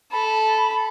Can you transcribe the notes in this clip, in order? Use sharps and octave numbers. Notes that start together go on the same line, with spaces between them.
A4 B5